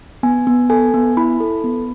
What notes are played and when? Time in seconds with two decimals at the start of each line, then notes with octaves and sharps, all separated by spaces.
0.23 B3 G#5
0.47 B3
0.70 A4 G#5
0.94 B3
1.17 E4 B5
1.40 A4
1.64 B3